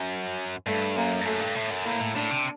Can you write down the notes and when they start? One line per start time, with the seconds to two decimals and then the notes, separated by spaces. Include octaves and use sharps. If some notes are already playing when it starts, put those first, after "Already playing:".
Already playing: F#2
0.67 G2 A3
0.96 F#2 A#3
1.21 G2
1.25 F#2 A3
1.41 G2
1.55 A2
1.71 F#2
1.85 A2 A#3
2.01 A2
2.15 A2 D4
2.31 C3